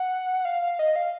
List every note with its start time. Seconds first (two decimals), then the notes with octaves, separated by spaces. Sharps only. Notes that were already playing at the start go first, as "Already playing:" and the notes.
Already playing: F#5
0.45 F5
0.62 F5
0.79 D#5
0.96 F5